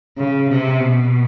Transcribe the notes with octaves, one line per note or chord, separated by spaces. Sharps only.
C#3
C3
B2